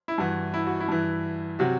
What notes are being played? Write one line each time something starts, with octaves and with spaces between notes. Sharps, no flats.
E4
G2 E3 F#4
E4
F#4
E4
G2 E3
C3 F#3 F#4